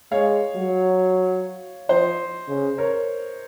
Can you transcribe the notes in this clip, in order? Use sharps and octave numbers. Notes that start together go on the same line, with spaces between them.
G#3 C#5 F5
F#3
F3 C5 D#5
C#3
A#4 C#5